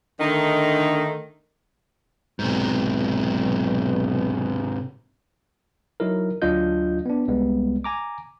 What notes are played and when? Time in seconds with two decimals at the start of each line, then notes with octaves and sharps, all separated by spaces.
0.20 D3 D#3 A3 D#4
2.39 B1 G#2 C3
6.00 F#3 D#4 E4 A#4
6.42 D2 F#3 D4 F4 D#5 G6
7.06 B3 D4
7.28 C2 G3 G#3 B3
7.84 G#5 A#5 D6